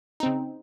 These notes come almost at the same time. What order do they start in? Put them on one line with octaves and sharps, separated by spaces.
D#4 C4 C#3